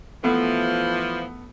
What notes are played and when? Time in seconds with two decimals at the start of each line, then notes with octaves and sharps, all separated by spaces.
0.24 E3 F3 A3 B3